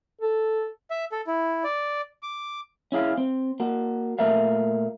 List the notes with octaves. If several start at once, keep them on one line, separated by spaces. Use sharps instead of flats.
A4
E5
A4
E4
D5
D6
C#4 E4 G#4 F5
C4
A#3 F#4
A#2 A3 A#4 E5 F5